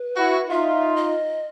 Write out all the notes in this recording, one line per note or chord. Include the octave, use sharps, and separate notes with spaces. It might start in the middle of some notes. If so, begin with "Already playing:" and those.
Already playing: B4
E4 F#4
D#4 F4 E5
D#5